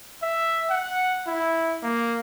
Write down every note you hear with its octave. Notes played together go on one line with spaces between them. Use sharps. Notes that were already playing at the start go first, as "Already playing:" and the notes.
E5
F#5
E4
A#3